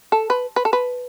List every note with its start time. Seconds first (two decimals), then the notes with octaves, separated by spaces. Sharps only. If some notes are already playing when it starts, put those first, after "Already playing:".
0.12 A4
0.30 B4
0.56 B4
0.65 A4
0.73 B4